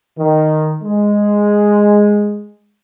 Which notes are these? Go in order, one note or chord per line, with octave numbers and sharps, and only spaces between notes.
D#3
G#3